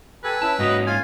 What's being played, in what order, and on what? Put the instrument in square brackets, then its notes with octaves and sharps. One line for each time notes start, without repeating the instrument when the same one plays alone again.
[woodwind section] G4 A4 G#5 [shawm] B4
[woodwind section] C#4 E4 [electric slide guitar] A5
[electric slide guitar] G#2 A#3 C#4 [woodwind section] F#4 D#5
[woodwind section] F4 [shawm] G#5